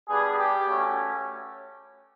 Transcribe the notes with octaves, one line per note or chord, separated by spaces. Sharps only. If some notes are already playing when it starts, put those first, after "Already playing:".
G3 B3 D4 G#4
G4
A3 C#4 F#4